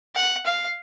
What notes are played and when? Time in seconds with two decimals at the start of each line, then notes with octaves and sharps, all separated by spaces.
0.15 F#5
0.45 F5